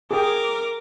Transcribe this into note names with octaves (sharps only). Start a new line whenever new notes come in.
G#4 A#4 G5 D6